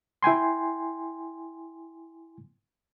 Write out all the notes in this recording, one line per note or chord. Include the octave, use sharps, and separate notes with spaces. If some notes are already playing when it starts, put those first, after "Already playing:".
E4 G5 G#5 C6